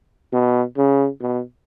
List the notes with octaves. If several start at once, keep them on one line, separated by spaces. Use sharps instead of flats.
B2
C#3
B2